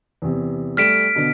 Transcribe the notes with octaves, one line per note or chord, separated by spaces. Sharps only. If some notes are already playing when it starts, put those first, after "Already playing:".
E2 C3
G3 A3 F6 B6 D7 E7
B2 D3